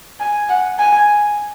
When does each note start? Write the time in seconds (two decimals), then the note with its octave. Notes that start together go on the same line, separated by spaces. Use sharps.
0.20 G#5
0.49 F#5
0.79 G#5